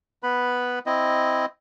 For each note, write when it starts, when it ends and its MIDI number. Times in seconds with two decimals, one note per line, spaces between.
0.23 0.79 59
0.23 0.79 71
0.23 0.79 83
0.86 1.46 60
0.86 1.46 64
0.86 1.46 75